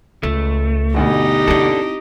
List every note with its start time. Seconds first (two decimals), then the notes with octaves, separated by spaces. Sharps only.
0.23 C#2 A3
0.94 G1 D2 B2 D#4 G4
1.48 C4 D4 E4 A4